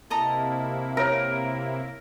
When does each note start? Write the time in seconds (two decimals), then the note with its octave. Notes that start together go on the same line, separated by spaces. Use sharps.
0.10 C3 A#3 E4 A4 D#5 A#5
0.97 A#4 C#5 E5